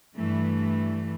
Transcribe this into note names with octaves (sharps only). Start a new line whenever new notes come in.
G2 E3 A3